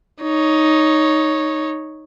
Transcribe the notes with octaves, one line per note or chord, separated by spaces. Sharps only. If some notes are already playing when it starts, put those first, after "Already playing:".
D#4 C#5